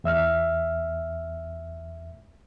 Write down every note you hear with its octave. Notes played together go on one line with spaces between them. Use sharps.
E2 E5 E6 F6